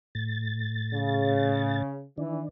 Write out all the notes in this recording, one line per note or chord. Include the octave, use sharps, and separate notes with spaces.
A2 A6
C#3
D#3 E3 D4